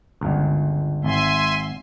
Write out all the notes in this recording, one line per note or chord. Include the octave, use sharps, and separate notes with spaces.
G1 C#2
G#1 E5 G#5 C6